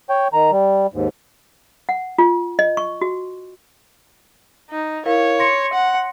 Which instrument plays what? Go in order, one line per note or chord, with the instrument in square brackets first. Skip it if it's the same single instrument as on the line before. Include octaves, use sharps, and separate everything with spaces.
[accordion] C#5 G5
D#3 A#5
G3
D#2 G#2
[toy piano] F#5
F4
D#5
C#6
F#4
[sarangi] D#4
[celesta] E4 A#4 F5 [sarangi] C#5
[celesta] C6 A#6 C#7
[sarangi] F#5